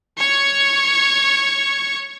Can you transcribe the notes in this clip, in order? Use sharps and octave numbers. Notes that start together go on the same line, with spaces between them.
C#5 C#6